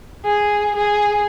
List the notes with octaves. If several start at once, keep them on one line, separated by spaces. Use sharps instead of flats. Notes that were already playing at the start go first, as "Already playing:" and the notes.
G#4
G#4